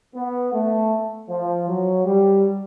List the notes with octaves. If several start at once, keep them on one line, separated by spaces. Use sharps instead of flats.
B3
A3
F3
F#3
G3